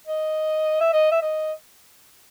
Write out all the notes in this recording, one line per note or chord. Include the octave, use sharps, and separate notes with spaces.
D#5
E5
D#5
E5
D#5